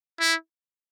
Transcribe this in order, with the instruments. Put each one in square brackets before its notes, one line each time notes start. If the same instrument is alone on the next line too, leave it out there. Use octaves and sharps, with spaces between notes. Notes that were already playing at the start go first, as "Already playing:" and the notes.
[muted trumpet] E4